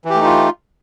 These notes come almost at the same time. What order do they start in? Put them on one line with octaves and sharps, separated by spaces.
E3 G4 A3 D#4 F4